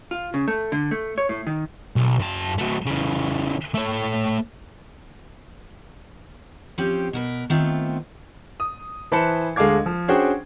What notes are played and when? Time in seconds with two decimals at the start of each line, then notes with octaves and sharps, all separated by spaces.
0.11 F4
0.34 C#3
0.48 A3
0.72 D3
0.91 A3
1.18 C#5
1.29 A2
1.47 D#3
1.96 B1
2.20 F#2 A5
2.58 F#3 A3
2.86 C#3 E3
3.74 A3 C#5
6.78 F3 C4 C#4 G4
7.13 B2 A#4 B4
7.50 D#3 A3 B3 C4 F4
8.60 D#6
9.12 E3 B4 C5 A5 C#7
9.56 D2 G#3 A4 F5 D6 G#6
9.86 F3
10.08 C#4 D4 F#4 G#4 C5 G5